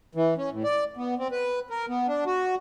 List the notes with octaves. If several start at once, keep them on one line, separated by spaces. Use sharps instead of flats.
E3
C#4
A2
D5
B3
C4
B4
A#4
B3
D4
F#4